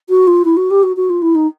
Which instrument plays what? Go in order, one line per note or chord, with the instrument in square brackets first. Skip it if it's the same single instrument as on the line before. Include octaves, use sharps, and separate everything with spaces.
[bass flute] F#4
F4
E4
F#4
G4
F#4
F#4
F4
E4
D#4